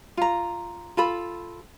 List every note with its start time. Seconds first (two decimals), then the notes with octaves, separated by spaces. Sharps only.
0.17 F4 A#5
0.97 F4 A4 B5